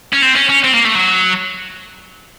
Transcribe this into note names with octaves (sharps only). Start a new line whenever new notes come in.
C#4
C4
C#4
C#4
C4
A#3
A3
F#3